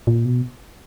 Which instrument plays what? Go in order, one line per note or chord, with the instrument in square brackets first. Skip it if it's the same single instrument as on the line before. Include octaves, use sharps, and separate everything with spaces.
[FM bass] A#2
B2